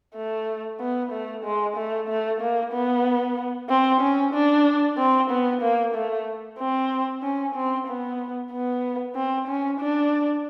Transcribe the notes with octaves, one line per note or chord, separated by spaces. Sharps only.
A3
B3
A3
G#3
A3
A3
A#3
B3
C4
C#4
D4
C4
B3
A#3
A3
C4
C#4
C4
B3
B3
C4
C#4
D4